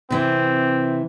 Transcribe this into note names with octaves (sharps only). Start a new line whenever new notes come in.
C3 E3 C4